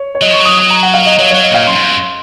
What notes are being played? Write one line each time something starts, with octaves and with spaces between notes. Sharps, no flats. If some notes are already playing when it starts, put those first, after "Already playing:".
Already playing: C#5
C#5
F#3 D#5
F3 C#6
F#3
D#6
D#6
A#5
F#5
F5
D#5
F#3 C#5
C#5
F#3
D#5
A#2 F5
F#2 C6
G#2
F#2